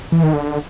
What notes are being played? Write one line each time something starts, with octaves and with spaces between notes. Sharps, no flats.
E3
D#3
D3